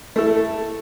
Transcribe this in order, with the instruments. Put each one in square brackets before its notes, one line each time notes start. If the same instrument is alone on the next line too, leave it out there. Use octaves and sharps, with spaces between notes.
[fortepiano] A3 E4 A4